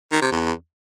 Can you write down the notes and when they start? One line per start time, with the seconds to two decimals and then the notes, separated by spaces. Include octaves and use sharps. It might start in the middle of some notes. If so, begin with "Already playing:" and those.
0.12 D#3
0.22 C3
0.32 E2